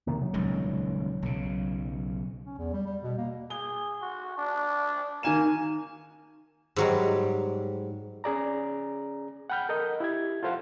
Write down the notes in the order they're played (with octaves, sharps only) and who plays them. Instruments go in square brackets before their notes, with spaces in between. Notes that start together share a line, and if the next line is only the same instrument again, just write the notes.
[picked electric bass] C3 D#3 A#3
F#3
[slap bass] D#1 C#2 D#3
B1 C#3
[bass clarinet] C#4
E2
G3
G3
B2
A#3
[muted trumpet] G#4 [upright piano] G7
[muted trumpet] F#4
D4
[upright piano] D#3 G#5 E7 [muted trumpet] A#3
[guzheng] G#2 F#3 G3
[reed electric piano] C#4 G#4 D5 A#5
F#5 G5 B5 F6 G6
A4 A#4 D#5
E4 G4 G#6
F4 A4 C5 F5 F#5